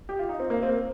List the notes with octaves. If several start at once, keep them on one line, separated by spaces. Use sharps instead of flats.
G4
F4
D#4
C4
A#3
C4
A#3